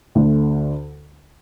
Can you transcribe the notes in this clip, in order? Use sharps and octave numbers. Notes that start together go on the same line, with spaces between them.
D2 D3 A3